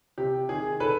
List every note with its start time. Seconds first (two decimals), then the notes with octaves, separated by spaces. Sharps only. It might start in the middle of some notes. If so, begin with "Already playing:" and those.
0.18 C3 G4
0.49 D#3 G#4
0.80 D#3 A4 B4